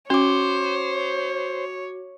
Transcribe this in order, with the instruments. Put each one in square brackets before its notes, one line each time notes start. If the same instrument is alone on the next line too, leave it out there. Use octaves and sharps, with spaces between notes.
[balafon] C#4 [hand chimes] F#4 D6 [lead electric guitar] C5 [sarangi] C#5